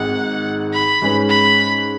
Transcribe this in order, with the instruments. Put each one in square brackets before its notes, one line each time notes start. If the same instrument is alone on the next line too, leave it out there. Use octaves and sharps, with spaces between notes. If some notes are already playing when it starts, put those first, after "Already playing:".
Already playing: [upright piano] G#1 G#2 D#3 [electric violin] F#5
[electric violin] B5
[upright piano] G#2 G#3 C#4 G#4 B4
[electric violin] B5